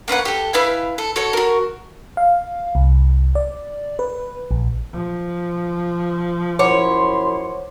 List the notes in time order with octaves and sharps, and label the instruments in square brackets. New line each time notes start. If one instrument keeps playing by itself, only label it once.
[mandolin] A#3 C#4 B4 F#5
G4 A4
E4 B4 F5 G#5
A4
F#4 A4 C#5
F#4 A#4
[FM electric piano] F5
C2
D5
B4
A#1
[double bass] F3
[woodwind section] F#2 E4 C6 [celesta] C5 F#5 D6 [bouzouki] C#5